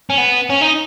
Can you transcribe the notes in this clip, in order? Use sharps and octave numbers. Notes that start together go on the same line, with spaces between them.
C#4
B3
C#4
D#4